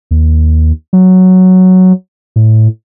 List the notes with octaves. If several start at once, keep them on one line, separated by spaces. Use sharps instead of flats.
D#2
F#3
A2